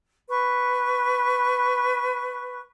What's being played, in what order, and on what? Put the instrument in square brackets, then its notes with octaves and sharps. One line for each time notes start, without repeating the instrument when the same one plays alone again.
[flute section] B4 C#6